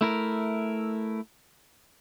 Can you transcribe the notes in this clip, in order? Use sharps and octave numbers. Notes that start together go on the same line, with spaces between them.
A3 E4 A#4